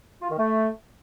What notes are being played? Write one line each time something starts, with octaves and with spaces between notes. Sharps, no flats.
F4
D#3
A3